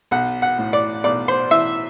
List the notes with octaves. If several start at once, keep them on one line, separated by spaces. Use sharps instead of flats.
B1 F#5
F#5
A2
D5
B1 D5
C5
E3 E5